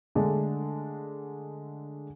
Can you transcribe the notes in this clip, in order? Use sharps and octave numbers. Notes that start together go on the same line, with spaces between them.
D3 G#3 A3 D4